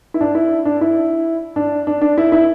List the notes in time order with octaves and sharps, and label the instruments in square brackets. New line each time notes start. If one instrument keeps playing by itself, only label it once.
[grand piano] E4
D4
E4
D4
E4
D4
D4
D4
E4
E4